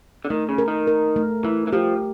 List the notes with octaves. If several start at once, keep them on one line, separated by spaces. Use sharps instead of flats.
D3
D#3 A3
C#3
A#4
D#3
A#4
A3
E3 A3
E3
F3 G4